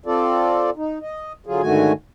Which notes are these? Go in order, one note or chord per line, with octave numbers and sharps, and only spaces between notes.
C4 F4 A4 D5
D#4
D#5
D3 F#3 F4 G#4
G#2 D3 D#3 A3 F#4 G#5